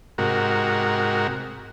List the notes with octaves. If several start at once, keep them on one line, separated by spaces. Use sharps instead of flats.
G#2 C3 F#4 A#4